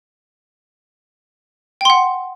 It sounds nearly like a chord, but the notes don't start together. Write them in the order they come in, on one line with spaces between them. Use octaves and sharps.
G5 C6 F#5